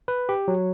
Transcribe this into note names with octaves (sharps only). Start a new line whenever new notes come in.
B4
G4
F#3